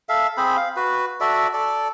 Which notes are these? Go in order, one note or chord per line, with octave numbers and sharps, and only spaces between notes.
A4 E5 F5
C4 G#4 C5 B5
F5
F#4 B4
F#4 A4 D5 E5
A4 D5